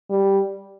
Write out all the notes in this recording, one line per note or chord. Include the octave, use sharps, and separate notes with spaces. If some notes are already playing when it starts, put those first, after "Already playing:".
G3